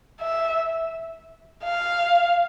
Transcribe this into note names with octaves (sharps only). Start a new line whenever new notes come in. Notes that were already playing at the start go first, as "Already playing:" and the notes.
E5
F5